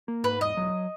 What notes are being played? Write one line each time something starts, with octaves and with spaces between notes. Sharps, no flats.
A#3
G#2 B4
E1 D#5
F#3